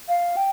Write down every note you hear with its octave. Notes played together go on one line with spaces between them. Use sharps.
F5
G5